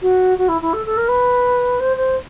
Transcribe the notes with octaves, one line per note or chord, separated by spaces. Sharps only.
F#4
F#4
E4
E4
A4
A4
A#4
B4
C5
C5